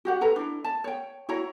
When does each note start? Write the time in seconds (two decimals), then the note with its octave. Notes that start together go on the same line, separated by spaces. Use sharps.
0.05 F#4 G4 F#5
0.21 A4 B4 A#5
0.36 D4 E4
0.64 A5
0.84 C#5 G5
1.29 E4 F#4 C#5 A#5